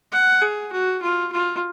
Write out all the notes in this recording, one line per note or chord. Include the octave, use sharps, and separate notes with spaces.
F#5
G#4
F#4
F4
F4